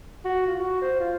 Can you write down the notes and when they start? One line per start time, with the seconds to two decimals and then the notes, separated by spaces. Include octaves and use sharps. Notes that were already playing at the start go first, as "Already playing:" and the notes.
0.25 F#4
0.47 F4
0.60 F#4
0.81 C5
1.00 F4